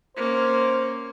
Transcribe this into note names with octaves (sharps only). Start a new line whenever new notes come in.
A#3 C#4 C5